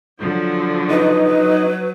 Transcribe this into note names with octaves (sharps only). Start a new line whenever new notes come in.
D3 F3 F#3
D#4 B4
F#3